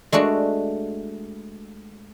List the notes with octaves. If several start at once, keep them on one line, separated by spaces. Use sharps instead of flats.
G#3 A3 D4 F#4